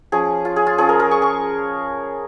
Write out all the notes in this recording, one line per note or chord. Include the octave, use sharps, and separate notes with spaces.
F3 C#4 F4 G#4
F4
G#4
F4
F3 C#4 F4 G#4
A#4
A#4
C#6
C#6